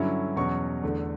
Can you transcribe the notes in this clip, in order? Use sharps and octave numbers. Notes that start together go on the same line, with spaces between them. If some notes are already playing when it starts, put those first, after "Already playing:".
Already playing: G2 D3 F#3 C#4 E4
E2 B2 F#3 C#4 C#6
E2 D3 A3